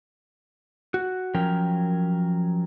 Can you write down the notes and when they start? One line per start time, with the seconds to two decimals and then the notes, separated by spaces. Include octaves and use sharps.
0.94 F#4
1.35 F3 F#3 C#4 A#4 G5